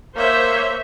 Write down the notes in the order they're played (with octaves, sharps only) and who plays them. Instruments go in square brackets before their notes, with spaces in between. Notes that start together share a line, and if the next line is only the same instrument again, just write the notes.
[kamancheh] A#3 E5 [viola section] C5 C#5